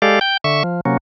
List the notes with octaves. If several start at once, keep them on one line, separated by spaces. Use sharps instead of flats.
G#3 G4 A4 D5 F5
G5 G6
D3 E5 C#6
F3
C3 F#3 A#3 C#4